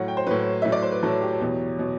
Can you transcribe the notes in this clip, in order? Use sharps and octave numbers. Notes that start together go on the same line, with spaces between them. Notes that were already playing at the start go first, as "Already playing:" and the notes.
Already playing: A2 F#3 F#5
G5
C5
A2 F#3 B4
A2 F#3 E5
D5
C5
B4
A2 F#3 A4
G4
A4
E2 B2 F#3 G4
B2 F#3